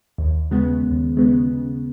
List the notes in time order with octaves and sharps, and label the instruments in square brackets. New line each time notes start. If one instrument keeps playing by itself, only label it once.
[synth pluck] D#2
C#3 G#3 B3
D#2
C#3 G#3 B3
C#3